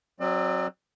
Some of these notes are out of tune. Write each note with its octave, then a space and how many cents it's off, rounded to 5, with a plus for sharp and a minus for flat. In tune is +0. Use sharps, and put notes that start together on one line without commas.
F#3 +0 C4 +30 D5 +45